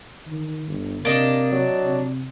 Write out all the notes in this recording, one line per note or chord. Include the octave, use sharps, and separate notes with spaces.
D#3
G1
C3 A#3 D4 D#5
F#3
C3